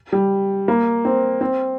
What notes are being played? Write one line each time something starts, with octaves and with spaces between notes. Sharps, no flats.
G3
A#3
C4
C4